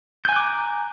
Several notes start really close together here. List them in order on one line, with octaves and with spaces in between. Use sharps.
G6 G#5 F#6 D6 A#5